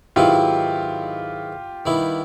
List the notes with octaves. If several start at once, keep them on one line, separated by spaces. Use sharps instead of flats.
G#2 D#3 F#3 B3 E4 F4 G4
D#3 G3 B3 E4